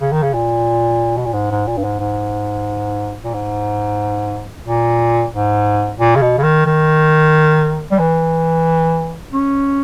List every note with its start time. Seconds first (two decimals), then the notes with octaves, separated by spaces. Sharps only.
0.01 C#3
0.12 D#3
0.23 C#3
0.33 A#2
1.17 B2
1.26 A#2
1.33 G#2
1.51 G#2
1.67 A#2
1.77 G2
1.84 G#2
2.00 G#2
3.25 A#2
3.34 G#2
4.66 A#2
5.33 G#2
6.00 A#2
6.15 C#3
6.22 B2
6.38 C#3
6.43 D#3
6.66 D#3
7.92 G3
7.99 E3
9.32 C#4